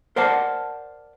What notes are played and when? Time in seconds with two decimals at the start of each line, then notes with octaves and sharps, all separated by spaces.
0.16 A#4 C5 D5 F#5 A5